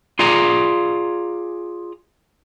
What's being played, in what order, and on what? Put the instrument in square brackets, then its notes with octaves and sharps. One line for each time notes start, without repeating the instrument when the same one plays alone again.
[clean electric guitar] F4 G#4 D5 G#5 A#5